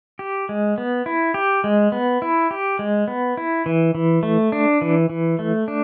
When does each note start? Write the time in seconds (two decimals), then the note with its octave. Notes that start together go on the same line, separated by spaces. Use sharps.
0.19 G4
0.49 G#3
0.78 B3
1.06 E4
1.34 G4
1.64 G#3
1.92 B3
2.22 E4
2.51 G4
2.79 G#3
3.08 B3
3.37 E4
3.66 E3
3.95 E3
4.23 A3
4.52 D4
4.82 E3
5.10 E3
5.39 A3
5.68 D4